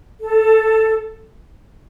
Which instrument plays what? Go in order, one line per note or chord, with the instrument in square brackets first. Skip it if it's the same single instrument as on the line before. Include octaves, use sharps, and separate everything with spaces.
[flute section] A4